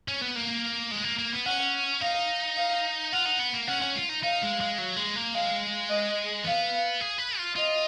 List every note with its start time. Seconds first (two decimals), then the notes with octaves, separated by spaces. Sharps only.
0.08 C#4
0.21 B3
0.35 A#3
0.91 G#3
1.04 A#3
1.19 A#3
1.33 B3
1.46 C#4 F#5
2.01 D#4 F5
2.57 F5
3.13 F4 F#5
3.26 D#4
3.39 B3
3.54 A#3
3.68 C#4 F#5
3.82 C#4
3.95 F4
4.09 D#4
4.23 D#4 F5
4.42 G#3
4.60 G#3
4.78 F#3
4.97 G#3
5.16 A#3
5.34 G#3 F5
5.89 D#5
6.45 B3 F5
7.01 G#4
7.18 B4
7.38 F4
7.56 F4 D#5